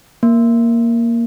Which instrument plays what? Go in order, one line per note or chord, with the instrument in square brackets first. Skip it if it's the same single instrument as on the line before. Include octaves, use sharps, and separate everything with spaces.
[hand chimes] A#3